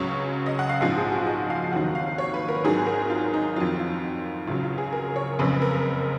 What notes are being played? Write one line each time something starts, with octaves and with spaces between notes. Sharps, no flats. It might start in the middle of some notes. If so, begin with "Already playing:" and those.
Already playing: C#2 C#3 F#3 C#5
D#5
F#5
F5
A#1 G#2 F3 F#5
G#4
F#4
D#5
F5
F1 D#2 D#3 F#3 F#5
F5
C#5
B4
A#4
G#1 G#2 D#3 F#3 G#4
A#4
F4
D#4
F2 D#3 F#3 F4
F4
C#2 C#3 F#3 F4
F4
G#4
A#4
C#5
F#1 F2 C#3 B4
A#4